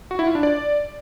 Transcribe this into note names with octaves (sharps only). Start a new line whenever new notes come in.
F#4
E4
F4
D4
D5